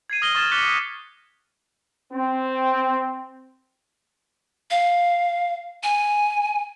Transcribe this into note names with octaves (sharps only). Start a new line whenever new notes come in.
G#6 C7 D#7
D#6 F6 A#6 D#7 G7
C#6 D#6 F6 G#6 A6 E7
C#6 D6 F#6 B6 C#7 G7
C4
F5
G#5